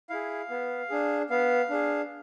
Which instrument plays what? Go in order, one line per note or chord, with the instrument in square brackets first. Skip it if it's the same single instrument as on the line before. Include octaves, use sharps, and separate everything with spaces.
[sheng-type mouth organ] E4 G#4 F5
B3
D4 G#4
B3 F5
D4 G#4